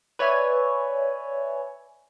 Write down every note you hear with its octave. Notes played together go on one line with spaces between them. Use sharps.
B4 C#5 D5 E5 G#5